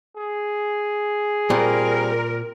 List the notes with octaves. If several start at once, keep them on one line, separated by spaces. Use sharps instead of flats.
G#4
A#2 G3 C4 A#4